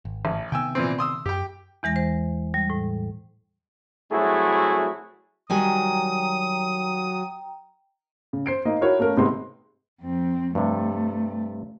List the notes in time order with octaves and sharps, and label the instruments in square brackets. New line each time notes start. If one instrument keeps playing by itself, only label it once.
[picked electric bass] G#1
[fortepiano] A1
[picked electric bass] C3 D#3 B3 [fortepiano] G5 G#5 E6
[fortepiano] A#2 E3 C4
C6 D#6 E6
[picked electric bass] F#2 [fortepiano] G4 G5
[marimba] E2 E3 G#3 A#6
C5
G3
A2
[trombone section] C2 F#3 A3 E4 F#4 G#4
[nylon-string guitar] D#3 G3 G#5 [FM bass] F#3 [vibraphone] G5 A#5 [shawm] D#6
[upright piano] C#3
C5 C7 D7
A#3 D#4 D#5
E4 F#4 A#4 C#5
A3 A#3 C#4 A#4
G#1 C3 G#3 B3 C6
[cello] F2 C4
[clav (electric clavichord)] G2 C3 [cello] A3